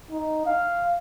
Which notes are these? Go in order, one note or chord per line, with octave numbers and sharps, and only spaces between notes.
D#4
F5